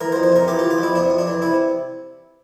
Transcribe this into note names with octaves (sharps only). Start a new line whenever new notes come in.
E3 A#4
C5
F2
C5
C3 A#4
E3 G4
E3 F4
G4
F2 E4
C3 D4
F2
D4
E3
C3 E4